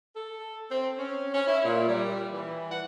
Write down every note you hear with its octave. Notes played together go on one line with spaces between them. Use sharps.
A4
C4
C#4
C#4
E4
A#2
G3
E3
F#5